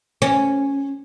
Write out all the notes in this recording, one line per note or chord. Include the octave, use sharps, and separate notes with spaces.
C#4